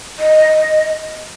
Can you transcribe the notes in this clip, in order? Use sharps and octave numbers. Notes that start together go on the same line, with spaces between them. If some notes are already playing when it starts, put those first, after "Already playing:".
D#5